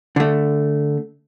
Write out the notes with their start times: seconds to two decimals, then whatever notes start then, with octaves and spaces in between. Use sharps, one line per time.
0.16 D3 A3